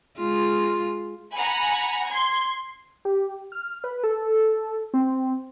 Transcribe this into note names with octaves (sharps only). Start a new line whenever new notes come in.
G#3 F4
F#5 G#5 A#5 B5
C6 G#6
G4
F6
B4
A4
C4